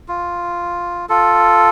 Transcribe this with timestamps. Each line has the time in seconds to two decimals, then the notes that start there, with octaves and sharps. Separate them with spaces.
0.08 F4
1.09 F4 A4